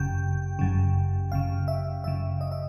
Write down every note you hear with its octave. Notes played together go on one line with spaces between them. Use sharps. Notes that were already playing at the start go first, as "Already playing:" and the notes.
Already playing: G1 F#2 C#3 G5
G1 F#2 C#3
G1 F#2 C#3 F5
E5
G1 F#2 C#3 E5
D#5
E5